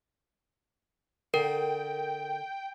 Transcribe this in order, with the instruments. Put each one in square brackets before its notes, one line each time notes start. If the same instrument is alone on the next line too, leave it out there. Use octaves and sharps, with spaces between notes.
[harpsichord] D3 [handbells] A#4 [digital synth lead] G5